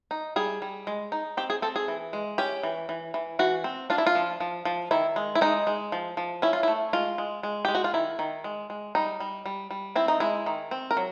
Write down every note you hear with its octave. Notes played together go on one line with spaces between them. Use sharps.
D#4
G3 G#4
G3
G#3
D#4
C4 G4
G#4
C4 A4
G#4
E3
G#3
C#4 G4
E3
E3
E3
E3 F#4
C4
D4 F4
E4
F4
F3
F3
F3
D#3 E4
G#3
E4
G#3 D#4
G#3
F3
F3
C#4 E4
F4
E4
A3
G#3 F4
G#3
G#3
G#3 G4
F#4
F4
D#3 E4
D#3
G#3
G#3
G3 D#4
G3
G3
G3
C4 E4
D#4
G#3 E4
D#3
C4
A#4
F#3